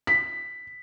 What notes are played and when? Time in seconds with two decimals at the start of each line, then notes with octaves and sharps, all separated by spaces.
0.07 B6